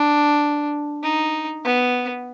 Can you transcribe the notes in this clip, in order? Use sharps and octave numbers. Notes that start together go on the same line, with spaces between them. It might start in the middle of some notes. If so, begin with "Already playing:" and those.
Already playing: D4
D#4
B3